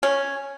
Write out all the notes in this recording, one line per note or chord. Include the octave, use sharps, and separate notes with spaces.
C#4